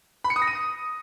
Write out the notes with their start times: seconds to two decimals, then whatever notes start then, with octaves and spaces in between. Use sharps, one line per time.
0.24 B5
0.30 C#7
0.36 D#6
0.42 A#6
0.47 D#7